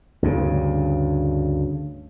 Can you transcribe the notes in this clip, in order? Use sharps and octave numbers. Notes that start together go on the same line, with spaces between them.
D2 G2 C#3